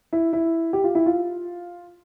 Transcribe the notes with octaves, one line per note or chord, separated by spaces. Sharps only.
E4
E4
G4
F4
E4
F4